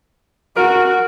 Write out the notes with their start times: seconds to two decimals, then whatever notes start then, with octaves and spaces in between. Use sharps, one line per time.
0.57 F#4 A#4